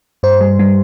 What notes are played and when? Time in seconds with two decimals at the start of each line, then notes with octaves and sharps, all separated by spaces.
0.23 G2 C5
0.41 G3
0.59 G3